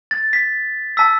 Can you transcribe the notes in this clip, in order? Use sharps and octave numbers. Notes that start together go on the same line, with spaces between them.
A6
B6
A5 E6 B6